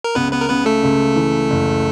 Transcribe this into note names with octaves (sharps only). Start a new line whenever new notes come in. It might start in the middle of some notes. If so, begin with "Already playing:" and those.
A#4
C#2 B3 B4
B3 B4
A#4
C#3 B3 B4
A3 A4
C#2
E3
F#1